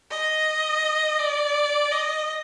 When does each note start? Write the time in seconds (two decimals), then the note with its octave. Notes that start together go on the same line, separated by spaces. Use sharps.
0.10 D#5
1.19 D5
1.91 D#5